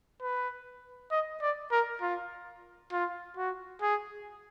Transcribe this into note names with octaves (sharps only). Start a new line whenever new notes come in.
B4
D#5
D5
A#4
F4
F4
F#4
G#4